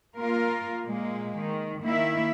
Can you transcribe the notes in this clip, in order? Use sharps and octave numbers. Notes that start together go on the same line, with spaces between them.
A#3 F4 A#4
A#2 G#3 A#3
D#3
D#3 A#3 E4 E5